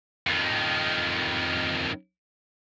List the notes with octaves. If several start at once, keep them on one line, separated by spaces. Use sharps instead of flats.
F2 D#3